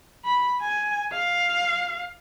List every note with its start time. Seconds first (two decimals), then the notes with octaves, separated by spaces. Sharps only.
0.25 B5
0.61 G#5
1.13 F5